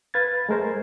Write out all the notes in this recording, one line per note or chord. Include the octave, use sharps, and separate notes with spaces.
B4 F5 G#6 A6
G#3 A3 A#4 C5